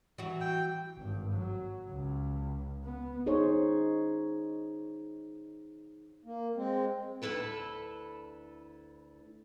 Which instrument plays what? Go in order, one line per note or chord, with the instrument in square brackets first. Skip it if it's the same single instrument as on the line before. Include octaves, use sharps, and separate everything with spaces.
[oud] E3 F#3 F#4
[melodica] G5
[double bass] G#1 G2
F#3
C#2
B3
[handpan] D#4 G#4 C5 C#5
[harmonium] A#3
G#3 C4
[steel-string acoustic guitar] D2 A#2 E4 A4 B4